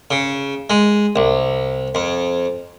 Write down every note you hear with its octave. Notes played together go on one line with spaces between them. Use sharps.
C#3
G#3
C2
F2